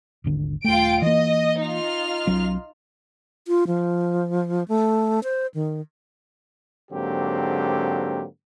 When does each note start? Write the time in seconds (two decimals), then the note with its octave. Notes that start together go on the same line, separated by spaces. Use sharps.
0.24 D#1 G#1 D3
0.64 D#1 A3 F4 G5 D7
1.02 E3 A#3 D#5
1.62 D#4 F4 F6
2.27 B1 F#3 C#4
3.48 F4
3.67 F3
4.68 A3
5.24 C5
5.54 D#3
6.92 G#2 D3 F#3 A#3 C4 G4